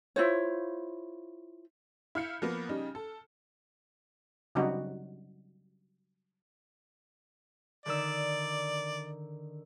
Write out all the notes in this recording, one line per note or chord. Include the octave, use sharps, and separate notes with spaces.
E4 F4 C5 C#5
E4 F5 F6 G6 C#7
F3 A#3 B3
C#3 G3 D#4
A4
C#3 F#3 G3 C4 D#4 F#4
D3 D#3 D5 E6